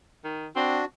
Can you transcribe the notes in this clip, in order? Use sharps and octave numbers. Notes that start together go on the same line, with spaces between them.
D#3
C4 D4 F#4